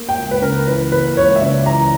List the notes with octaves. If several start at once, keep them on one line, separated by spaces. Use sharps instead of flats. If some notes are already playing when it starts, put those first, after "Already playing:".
Already playing: A#3
G5
C#2
B4
C#3 A#4
E3 B4
A#3 B4
C#2 C#5
E5
C#3 D5
E3 A#5